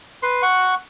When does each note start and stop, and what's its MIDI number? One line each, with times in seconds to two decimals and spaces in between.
0.23 0.42 71
0.23 0.42 84
0.42 0.75 78
0.42 0.75 85